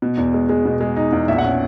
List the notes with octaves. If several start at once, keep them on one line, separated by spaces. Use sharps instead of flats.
B2
E2
G#3
G#3
B2
G#3
D#4
E2
A#1 E5
F#5
C#4